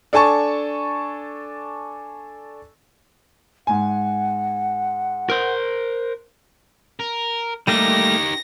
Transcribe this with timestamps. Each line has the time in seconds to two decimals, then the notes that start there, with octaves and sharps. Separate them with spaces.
0.13 D4 A4 G#5 A5 C#6
3.67 G#2 F#5 G#5
5.30 A#4 C5
7.00 A#4
7.67 G3 A3 A#3 D#4 G4 A#6